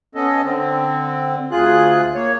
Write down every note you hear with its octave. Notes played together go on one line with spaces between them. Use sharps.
B3 C#4 A4 D#5
D3 C4
D2 F4 G#4 F#6
A#3 C#5